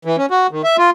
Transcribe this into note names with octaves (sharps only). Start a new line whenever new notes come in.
E3
C#4
F#4
D#3
E5
F4